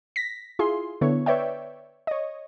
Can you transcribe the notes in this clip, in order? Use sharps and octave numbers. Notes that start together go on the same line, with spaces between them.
A#6 B6
E4 F4 G#4 C6
D3 B3 E4 C#5
B4 C#5 D5 E5 G5
C#5 D#5